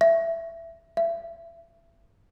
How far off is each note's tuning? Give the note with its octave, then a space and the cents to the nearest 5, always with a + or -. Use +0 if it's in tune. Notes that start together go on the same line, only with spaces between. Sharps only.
E5 +10
E5 +30